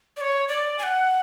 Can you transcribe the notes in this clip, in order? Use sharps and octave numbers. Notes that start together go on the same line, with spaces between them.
D5
C#5
D5
G#5
F#5